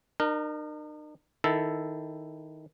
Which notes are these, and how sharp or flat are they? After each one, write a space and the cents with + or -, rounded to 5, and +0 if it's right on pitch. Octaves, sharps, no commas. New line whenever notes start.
D#4 -45 A#4 +0
D#3 +10 E4 +0 A4 +0